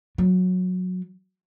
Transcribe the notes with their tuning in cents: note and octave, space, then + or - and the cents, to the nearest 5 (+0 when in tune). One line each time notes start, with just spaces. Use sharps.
F#3 -15